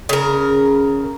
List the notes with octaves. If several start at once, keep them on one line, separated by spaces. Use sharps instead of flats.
C#3 A#4